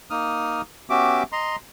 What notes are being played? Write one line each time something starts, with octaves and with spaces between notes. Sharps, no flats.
A#3 D#4 D#6 F6
B3 C#4 F#4 G4 E5 D6
D#5 A#5 C6